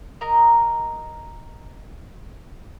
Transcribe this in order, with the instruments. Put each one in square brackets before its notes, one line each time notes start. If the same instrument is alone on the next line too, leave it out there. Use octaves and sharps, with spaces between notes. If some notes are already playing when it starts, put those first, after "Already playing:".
[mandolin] A#4 D#5 A#5